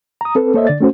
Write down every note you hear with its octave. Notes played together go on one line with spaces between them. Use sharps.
A#5 D#6
C4 A4 B4
A#3 A4 C5 C#5 D#5 E5
D3 D5 A6
A3 C#4 F#4 C5